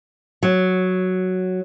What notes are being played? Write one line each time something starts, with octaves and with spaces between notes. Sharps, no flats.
F#3